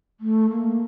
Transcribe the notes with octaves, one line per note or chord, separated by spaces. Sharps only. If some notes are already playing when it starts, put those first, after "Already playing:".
A3
A#3